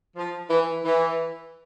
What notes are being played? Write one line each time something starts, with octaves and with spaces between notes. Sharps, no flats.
F3
E3
E3